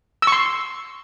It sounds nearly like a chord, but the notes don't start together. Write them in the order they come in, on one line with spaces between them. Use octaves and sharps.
E6 C#6 C6